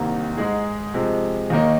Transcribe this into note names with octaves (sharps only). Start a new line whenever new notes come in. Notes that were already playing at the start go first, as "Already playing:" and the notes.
Already playing: C2 C3 D#3 A#3
G#2 G#3 D#4 G#4
C3 F3 G#3
D#2 D#3 A#3 D#4